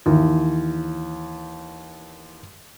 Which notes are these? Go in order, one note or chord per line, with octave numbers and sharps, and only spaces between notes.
D#2 E3